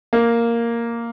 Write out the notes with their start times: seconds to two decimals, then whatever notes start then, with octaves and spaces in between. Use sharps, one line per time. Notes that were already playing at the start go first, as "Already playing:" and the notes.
0.13 A#3